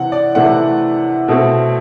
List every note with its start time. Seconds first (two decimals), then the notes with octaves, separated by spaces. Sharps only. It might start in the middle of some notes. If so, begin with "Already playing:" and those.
Already playing: C3 E3 C4 F#5
0.12 D5
0.35 C3 E3 A3 C4 F#5
1.28 B2 A3 C4